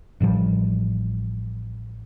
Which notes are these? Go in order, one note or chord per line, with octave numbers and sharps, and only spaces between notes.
A1 A2 F3 G3